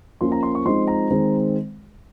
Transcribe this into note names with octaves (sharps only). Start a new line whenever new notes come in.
F3 A#3 C#4 C6
A#5
C6
C#6
F3 G#3 C4 D#4 C6
A#5
D#3 G#3 C4